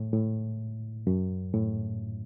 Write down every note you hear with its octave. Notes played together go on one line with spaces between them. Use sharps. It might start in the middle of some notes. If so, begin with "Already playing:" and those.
Already playing: A2
A2
F#2
A2